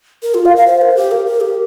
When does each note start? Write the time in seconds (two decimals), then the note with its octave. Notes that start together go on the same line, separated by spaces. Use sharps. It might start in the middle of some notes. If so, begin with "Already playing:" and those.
0.23 A#4
0.34 F4
0.45 F5
0.56 F5
0.67 C5
0.82 A#4
0.96 G4
1.11 A#4
1.26 A#4
1.41 G4